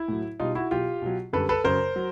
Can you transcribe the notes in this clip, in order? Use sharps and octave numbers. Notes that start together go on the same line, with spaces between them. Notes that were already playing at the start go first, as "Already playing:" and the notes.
Already playing: E4
A2 F#3
B2 G3 D#4 F4
E4 F#4
B2 F#3 F4 G4
B2 F#3
F#2 D3 G3 A4 B4
A4 B4
F#2 C#3 F#3 A#4 C5
F#3